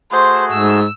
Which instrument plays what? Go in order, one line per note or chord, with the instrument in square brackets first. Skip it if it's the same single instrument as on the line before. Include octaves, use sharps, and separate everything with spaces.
[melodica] A3 F#4 G#4 [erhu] C5
[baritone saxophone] G#2 [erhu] E6